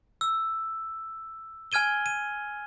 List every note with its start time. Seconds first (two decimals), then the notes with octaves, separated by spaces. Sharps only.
0.21 E6
1.72 G#5 F6 G#6 D#7 G7
2.06 D#7